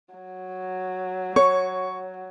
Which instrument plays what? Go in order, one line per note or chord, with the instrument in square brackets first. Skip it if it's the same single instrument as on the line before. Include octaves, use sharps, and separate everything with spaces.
[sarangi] F#3
[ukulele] C#5 [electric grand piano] C#6